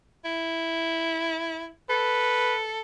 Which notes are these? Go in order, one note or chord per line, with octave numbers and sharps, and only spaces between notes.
E4
A4 B4